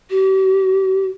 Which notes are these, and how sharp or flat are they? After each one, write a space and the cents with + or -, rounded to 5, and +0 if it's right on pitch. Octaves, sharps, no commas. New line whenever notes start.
G4 -45